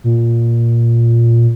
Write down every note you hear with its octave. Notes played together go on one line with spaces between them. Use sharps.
A#2